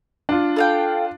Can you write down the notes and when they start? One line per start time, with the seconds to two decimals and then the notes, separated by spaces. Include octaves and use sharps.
0.29 D4 F4
0.56 A4 F5 G5